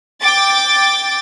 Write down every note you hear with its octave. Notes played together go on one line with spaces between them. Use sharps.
G5 D6 A6